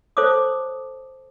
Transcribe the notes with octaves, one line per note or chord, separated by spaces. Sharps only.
A4 C5 C#5 A5 D6 D#6